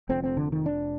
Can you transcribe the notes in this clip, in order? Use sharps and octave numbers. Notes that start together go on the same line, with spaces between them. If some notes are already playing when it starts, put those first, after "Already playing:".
F1 F2 D3 C4
C4
D3
D#3
D4